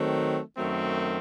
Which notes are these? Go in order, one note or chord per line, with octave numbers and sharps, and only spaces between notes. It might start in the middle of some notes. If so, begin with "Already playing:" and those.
Already playing: D#3 F#3 A3 C4
F#2 D#3 F#3 A3 C4